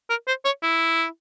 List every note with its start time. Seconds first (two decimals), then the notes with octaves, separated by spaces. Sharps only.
0.10 A#4
0.28 C5
0.45 C#5
0.63 E4